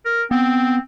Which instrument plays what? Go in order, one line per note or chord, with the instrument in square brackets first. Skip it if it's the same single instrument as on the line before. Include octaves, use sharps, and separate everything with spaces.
[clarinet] A#4
[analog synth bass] B3 [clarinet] C4